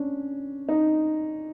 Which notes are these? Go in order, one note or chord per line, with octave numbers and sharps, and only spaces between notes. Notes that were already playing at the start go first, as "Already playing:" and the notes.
Already playing: C#4 D4
D#4